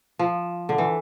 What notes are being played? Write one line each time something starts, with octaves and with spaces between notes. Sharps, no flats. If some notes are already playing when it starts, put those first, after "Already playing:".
F3
D3
E3